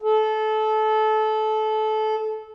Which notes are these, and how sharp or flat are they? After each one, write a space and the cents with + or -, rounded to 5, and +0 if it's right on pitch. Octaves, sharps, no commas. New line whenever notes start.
A4 -25